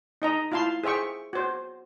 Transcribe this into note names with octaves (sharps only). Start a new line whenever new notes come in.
D#4 D#5 A#5
E4 F4 F5 A5 C6
G#4 C5 E5 G5 C#6
F#4 C5